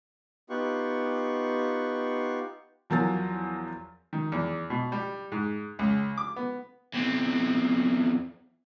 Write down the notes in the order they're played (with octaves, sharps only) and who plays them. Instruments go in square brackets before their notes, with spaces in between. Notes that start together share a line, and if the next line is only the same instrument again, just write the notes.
[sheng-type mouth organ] B3 D#4 F4 G4 F#5 C#6
[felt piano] E2 F3 F#3 A#4 G#5 A6
[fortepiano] D#3
E2
B2
G3
G#2
C#2
D6
B3
[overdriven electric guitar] E2 C4